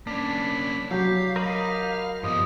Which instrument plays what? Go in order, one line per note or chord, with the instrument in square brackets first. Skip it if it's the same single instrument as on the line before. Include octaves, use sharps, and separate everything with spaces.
[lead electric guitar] A#3 C#4 [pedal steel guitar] D4 [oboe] B5
[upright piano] F#3 [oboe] G4 [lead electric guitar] F5
[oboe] G4 [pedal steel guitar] A#4 D#5 B5
[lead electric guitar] G2 B3 [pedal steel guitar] F3 G3 [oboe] D#5